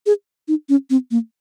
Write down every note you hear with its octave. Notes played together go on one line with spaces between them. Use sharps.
G#4
D#4
C#4
C4
A#3